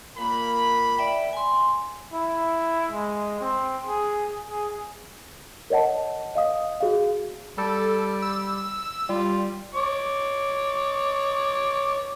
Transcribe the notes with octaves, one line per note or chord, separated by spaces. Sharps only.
A#2 A#3 B5
D5 E5 G5
G#5 C6
E4
G#3
C4
G#4
G#4
A#4 C#5 D#5 F#5 A5
D#5 F5 D#6
F#4 G#4 F5
G3 A4
E6
G3 F4
C#5 D6